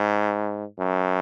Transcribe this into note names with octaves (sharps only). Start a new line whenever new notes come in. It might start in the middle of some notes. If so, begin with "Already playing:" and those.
Already playing: G#2
F#2